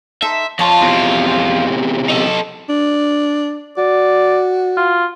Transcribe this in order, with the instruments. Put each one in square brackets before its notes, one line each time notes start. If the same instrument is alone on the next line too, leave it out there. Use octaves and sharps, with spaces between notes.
[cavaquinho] D#4 A4 C5 [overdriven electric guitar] E5
[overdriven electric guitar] F2 F4 [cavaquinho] C#5 A5
[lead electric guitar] E2 C3
[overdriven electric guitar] D#4 A4
[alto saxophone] D4
[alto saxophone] F#4 [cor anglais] D5
[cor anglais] F4